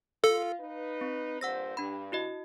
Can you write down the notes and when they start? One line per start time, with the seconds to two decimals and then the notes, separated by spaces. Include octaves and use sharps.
0.24 F4 A4 F5
0.60 D#4 B4
1.01 C4
1.41 G2 A#2 C5 F#5 E6 A#6
1.77 G2 D4 B5
2.12 E4 F#4 D#5